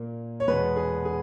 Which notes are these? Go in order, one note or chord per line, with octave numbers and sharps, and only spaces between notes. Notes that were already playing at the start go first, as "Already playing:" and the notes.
Already playing: A#2 A#3
C#5
E2 B2 G#3 B3 B4
G#4
G#4